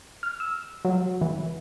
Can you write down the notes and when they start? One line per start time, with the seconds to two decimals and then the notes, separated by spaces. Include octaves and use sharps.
0.23 F6
0.40 E6
0.85 F#3
1.21 E3